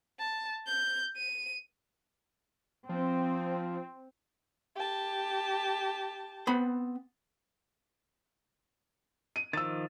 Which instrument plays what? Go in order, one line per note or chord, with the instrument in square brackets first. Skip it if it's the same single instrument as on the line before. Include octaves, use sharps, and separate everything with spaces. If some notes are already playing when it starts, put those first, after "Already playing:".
[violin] A5
G6
D#7
[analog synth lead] F3 [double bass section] C4
[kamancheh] G4 A5
[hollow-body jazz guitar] B3 C4 B5
[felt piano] D#7
[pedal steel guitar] D#3 F3 [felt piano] E6 A6